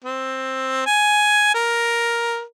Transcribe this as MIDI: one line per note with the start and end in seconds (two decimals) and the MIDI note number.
0.05 0.82 60
0.86 1.50 80
1.55 2.42 70